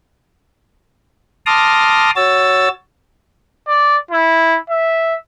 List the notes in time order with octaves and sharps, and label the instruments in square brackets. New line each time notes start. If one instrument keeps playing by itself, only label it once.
[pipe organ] A5 C6 D6 D#6 F6 A#6
F#4 C#5 E6 A6
[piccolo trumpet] D5
E4
E5